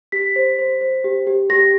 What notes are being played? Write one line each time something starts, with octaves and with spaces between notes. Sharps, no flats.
G4 B6
C5
C5
C5
G4
G4
G4 A#6